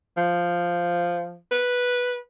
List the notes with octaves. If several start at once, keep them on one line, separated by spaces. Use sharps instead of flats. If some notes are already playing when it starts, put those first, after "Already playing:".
F3
B4